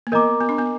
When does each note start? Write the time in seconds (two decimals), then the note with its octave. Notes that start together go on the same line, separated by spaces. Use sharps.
0.07 A#3
0.12 B3 A#4 D#5 A#5 D6
0.41 B3
0.49 D4
0.59 B3